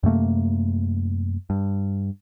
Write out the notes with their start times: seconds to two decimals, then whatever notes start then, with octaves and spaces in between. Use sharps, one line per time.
0.03 F#2 C3 A3 A#3
1.50 G2